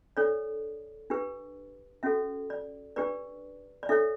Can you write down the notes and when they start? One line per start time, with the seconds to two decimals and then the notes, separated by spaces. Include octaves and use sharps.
0.17 D4 A4 C#5 D5
1.10 D4 G4 B4
2.03 C#4 F#4 A4 E5
2.50 D5
2.96 D4 G4 B4 D5
3.83 D5
3.89 D4 A4 C#5 E5